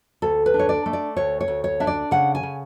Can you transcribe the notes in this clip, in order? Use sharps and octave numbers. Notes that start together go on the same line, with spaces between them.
D2 A4
B4
D4
C#5
D5
A3
D5
D2 C#5
C#5
D2
C#5
D4 E5
D5
C#3 F#5
G#5
C#3